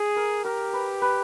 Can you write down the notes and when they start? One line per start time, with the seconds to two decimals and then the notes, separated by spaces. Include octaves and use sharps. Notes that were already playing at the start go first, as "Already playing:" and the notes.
Already playing: G#4
0.16 A#4
0.44 G4 A#4
0.73 B4
1.02 B4